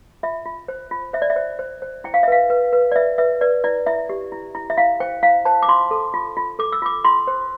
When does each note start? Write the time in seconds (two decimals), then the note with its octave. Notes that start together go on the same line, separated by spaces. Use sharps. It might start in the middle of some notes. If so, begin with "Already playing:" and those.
0.23 F4 E5
0.45 F4
0.68 C5
0.91 F4
1.13 C5 E5
1.22 D5
1.30 E5
1.36 C5
1.59 C5
1.82 C5
2.04 E4 G5
2.14 F5
2.23 E5
2.28 B4 F5
2.50 B4
2.73 B4
2.92 D5
2.96 B4 E5
3.18 B4 E5
3.41 B4 D5
3.64 E4 D5
3.86 E4 E5
4.09 G4
4.32 E4
4.55 E4
4.70 E5
4.77 E4 F5
5.00 C5 G5
5.23 E4 F5
5.45 C5 A5
5.62 D6
5.68 F4 C6
5.91 A4
6.14 F4
6.37 F4
6.59 A4 D6
6.72 E6
6.82 F4 D6
7.04 F4 C6
7.27 C5